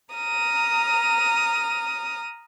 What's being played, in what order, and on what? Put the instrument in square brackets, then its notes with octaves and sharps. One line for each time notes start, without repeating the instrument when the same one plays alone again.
[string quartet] A#5 D#6 F6